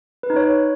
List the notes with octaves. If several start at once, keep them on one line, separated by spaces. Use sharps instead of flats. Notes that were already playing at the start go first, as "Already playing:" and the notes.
B4
D#4
C#5